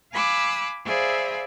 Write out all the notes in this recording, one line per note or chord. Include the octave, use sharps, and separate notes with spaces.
F5 G#5 B5 D6 E6 F#6
G#4 C5 D5 E5 F5 B5